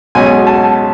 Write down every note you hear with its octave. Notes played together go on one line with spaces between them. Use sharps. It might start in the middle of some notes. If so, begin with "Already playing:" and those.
B1 B2 G#3 C#4 G#5
A5